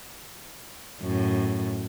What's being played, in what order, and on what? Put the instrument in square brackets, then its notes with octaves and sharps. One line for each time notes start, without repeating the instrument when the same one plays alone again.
[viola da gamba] F#2 A2